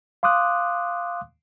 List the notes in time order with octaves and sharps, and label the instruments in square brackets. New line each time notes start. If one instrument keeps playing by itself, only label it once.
[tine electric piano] F5 C6 D6 D#6 F#6